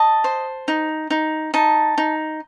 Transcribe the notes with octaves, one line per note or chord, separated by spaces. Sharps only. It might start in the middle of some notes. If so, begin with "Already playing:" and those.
Already playing: D#5 A5
C5
D#4
D#4
D#4 A5
D#4